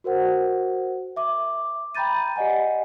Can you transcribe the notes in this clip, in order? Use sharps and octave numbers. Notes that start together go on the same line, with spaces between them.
F#4 A#4 C5 F#5
E5 D6
G5 A#5 B5 G6 A6 D#7
G4 D5 D#5 F#5 G#5